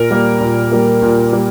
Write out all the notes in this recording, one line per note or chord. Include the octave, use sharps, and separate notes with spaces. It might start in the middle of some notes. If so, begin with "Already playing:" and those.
Already playing: A#2 A#4
G3 A#3
A#2
G3 A#3
A#2
G3 A#3